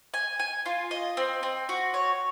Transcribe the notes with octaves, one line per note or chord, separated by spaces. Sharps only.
G#5
G#5
F4
D#5
C4
C4
F#4
C#5